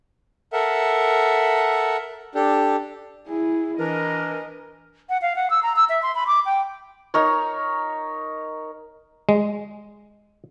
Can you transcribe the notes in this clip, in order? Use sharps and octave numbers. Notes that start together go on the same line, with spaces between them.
A4 A#4 E5 F#5
D4 G4 A4
E4 G#4
E3 D4 A#4 D#5
F#5
F5
F#5
E6
A#5
E6
E5
C6
B5
D6
G5
D#4 A#4 C#5
G#3